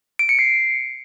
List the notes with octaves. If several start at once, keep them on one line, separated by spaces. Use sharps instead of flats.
D7
C#7
C7